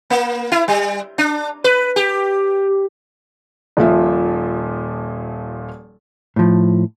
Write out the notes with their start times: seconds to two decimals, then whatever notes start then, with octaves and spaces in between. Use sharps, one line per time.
0.10 A#3
0.52 E4
0.68 G3
1.18 D4
1.64 B4
1.96 G4
3.77 D#1 A#2 F3 E5
6.36 A2 F3